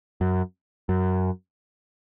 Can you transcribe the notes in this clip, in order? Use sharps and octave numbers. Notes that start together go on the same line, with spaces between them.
F#2
F#2